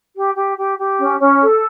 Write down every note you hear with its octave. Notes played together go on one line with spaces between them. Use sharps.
G4
G4
G4
G4
C#4
C#4
A4